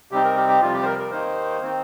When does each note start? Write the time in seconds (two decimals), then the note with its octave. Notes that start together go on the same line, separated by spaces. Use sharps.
0.11 C3 G3 C4 D#4 G4
0.24 A#4
0.37 G4
0.49 G4
0.61 F2 C3 G3 F4
0.74 G4
0.82 C5
0.86 A#4
0.99 A#4
1.11 D#2 D#3 A#3 D#4 C5
1.62 D#3 C4 D#4